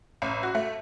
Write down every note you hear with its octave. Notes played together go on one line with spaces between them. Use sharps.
A1
F#4
A3